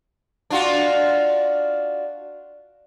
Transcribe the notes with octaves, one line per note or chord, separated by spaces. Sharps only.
D4 F4 F#4